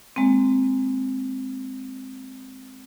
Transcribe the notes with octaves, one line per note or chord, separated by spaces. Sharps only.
G#3 A#3 C4